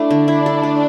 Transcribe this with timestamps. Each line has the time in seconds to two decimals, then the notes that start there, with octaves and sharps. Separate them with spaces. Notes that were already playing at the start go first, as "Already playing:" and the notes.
Already playing: A3 D4 E4 A4
0.11 D3
0.28 E4
0.46 A4
0.63 A3